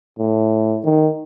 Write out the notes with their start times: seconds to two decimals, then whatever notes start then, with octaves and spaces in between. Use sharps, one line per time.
0.19 A2
0.84 D#3